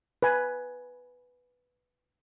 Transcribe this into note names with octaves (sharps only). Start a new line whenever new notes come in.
B4 G#5